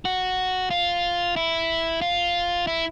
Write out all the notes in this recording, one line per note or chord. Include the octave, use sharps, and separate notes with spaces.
F#4
F4
E4
F4
E4